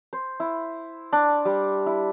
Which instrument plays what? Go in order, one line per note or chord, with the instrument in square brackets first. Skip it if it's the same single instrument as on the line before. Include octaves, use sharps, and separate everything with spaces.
[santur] C5
E4
D4
G3
E4